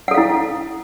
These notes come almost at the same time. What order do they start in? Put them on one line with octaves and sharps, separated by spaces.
F#5 A4 F5 E4